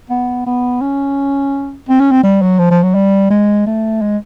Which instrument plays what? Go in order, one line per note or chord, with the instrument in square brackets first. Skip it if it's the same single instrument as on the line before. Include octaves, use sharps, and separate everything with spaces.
[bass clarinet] B3
B3
C#4
C4
C#4
C4
G3
F#3
F3
F3
F#3
G3
G#3
A3
G#3